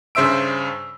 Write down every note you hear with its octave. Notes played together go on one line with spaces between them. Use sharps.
G2 C#3 C5 E5 E6 D7